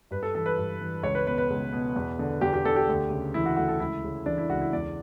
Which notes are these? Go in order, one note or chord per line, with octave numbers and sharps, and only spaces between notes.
G2 B4
A4
E3 A4
B4
G2
E3
C#2 C#5
B4
B2 B4
B4
C#2
B2
E2
D3
E2 G4
G4
D3 A4
G4
D2
C#3
E3 E4
F#4
D2 F#4
A4
C#2 E4
C#3
E3 D4
E4
C#2 F#4
E4
E2 D5